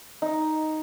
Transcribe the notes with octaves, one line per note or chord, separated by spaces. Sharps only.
D#4